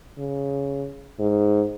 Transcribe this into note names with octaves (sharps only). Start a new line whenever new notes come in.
C#3
G#2